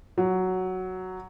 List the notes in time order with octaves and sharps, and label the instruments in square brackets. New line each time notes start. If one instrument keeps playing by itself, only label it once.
[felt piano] F#3